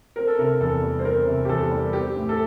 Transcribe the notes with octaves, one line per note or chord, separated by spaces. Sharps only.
C4 A#4
A4
C3 A#4
E2 A4
G3
C5
C4 A#4
C3
G4
E2 A4
G3
C4 G4
A2
A4